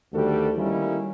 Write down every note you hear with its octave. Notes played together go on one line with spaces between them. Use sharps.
D2 D#3 G3 F#4 G4 A4
D#3 G3 A#3 C#4 D#4 E4